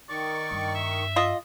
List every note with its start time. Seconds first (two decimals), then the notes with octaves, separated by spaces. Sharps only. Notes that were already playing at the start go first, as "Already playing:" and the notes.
0.09 D#3 D5 C#6
0.51 G2
0.75 E5
1.16 F4 D#5